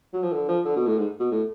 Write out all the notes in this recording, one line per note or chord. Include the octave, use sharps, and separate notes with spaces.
F#3
F3
D3
F3
D3
B2
A2
G#2
B2
A2